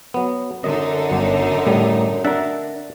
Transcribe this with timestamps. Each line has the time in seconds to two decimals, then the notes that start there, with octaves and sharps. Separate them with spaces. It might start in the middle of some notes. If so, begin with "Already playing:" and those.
0.14 F#3 B3
0.64 F#2 D3 D#4 D#5
1.10 G1 F#3
1.67 A2 G3
2.25 D4 A#4 E5 F#5